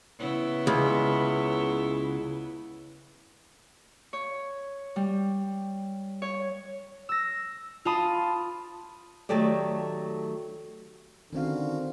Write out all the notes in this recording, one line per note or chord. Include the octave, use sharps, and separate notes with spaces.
C#3 B3 E4
C#2
C#5
G3
C#5
E6 A#6
F4 F5 A5 B5 D#6
D#3 F#3 A3 G4 A4 D5
D3 D#3 C4 C#4 D#4 F#4 F5